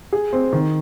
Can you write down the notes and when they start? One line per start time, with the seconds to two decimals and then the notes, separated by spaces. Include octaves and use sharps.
0.13 G#4
0.33 C4
0.53 D#3